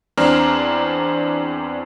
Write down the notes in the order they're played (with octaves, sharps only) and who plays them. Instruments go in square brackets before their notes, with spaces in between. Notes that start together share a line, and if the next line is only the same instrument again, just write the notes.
[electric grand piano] E2 C4 D4 A#5 F6